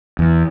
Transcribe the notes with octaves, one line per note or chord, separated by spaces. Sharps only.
E2